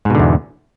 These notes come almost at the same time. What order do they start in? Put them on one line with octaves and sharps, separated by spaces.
G#2 B2 D3 E2